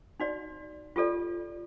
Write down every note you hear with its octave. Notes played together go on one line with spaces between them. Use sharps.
D#4 F#4 D5
F4 G4 A4 D5